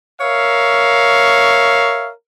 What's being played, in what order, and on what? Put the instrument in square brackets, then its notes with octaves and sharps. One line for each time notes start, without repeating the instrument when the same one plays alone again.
[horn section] A#4 C#5 E5 F5